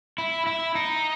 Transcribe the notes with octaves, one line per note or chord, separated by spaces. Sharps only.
E4
E4
D#4